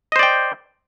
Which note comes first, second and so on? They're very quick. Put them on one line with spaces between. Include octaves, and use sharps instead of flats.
D#5 C5 D5 G5